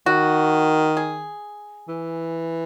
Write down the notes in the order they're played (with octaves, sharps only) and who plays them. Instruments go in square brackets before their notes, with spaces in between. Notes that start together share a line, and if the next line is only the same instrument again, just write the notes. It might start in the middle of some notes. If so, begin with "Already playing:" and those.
[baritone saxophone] D#3 [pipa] F#4
[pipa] G#4
[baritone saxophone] E3